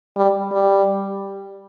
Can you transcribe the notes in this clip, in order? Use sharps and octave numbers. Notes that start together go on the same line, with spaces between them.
G3
G3